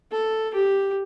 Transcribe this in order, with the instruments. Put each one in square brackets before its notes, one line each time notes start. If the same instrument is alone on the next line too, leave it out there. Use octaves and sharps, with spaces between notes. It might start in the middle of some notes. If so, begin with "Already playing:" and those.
[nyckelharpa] A4
G4